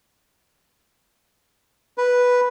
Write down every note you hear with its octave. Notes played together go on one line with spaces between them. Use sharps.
B4